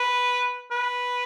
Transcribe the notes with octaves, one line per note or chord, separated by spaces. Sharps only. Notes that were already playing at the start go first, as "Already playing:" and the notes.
Already playing: B4
B4